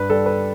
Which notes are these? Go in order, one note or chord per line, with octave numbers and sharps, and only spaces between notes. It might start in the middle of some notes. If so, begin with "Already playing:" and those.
Already playing: G2 B4
G3 A4
B4